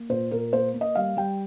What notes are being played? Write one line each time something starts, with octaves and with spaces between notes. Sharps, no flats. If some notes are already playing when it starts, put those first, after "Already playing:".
Already playing: A#3
A#2 C5
A#2 A#4
A#3 C5
A#3
D#5
G3 F5
G3 G5